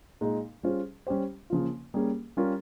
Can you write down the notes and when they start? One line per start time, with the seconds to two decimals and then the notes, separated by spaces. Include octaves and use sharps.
0.21 A#2 G#3 D#4
0.63 G3 C#4 F4 G#4 C5
1.07 G3 C#4 G4 C5
1.50 C#3 F3 A#3 F4
1.94 G3 A#3 C#4 G#4
2.37 G3 C#4 F4 A#4